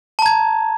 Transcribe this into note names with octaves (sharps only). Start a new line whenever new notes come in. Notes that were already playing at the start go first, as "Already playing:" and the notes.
A5 A#5 G#6